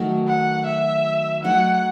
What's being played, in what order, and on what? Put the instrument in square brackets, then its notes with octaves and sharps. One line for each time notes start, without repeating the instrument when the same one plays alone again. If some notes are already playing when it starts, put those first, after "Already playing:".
Already playing: [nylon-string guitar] D#3 F#3 A3 D#4 F#4
[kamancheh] F#5
E5
[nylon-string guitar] F#3 A3 D#4 [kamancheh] F#5